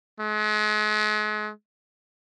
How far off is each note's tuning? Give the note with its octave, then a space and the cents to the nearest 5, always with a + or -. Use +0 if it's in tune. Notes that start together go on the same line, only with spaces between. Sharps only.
G#3 +40